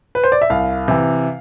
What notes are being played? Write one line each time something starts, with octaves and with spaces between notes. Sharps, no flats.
B4
C5
D5
E5
C2 F5
C3 E3